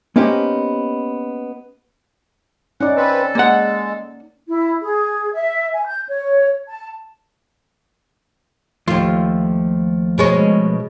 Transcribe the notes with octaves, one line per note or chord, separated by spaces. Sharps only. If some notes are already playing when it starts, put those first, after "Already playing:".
A#3 B3 C#4 D#4 G4 C5
C#4 D#4 D5 F#5
C4 A4 B4
G#3 A#3 F#5
E4
G#4
E5
G#5
G6
C#5
A5
D#2 F3 A3 F4
B2 G#3 C#4